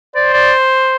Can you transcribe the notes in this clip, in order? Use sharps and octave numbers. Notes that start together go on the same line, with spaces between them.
C5 D5
D5